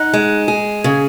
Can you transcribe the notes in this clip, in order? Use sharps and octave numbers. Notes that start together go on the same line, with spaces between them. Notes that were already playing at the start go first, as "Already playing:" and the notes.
Already playing: D#4 F#5
G#3
G#4
C#3 G#5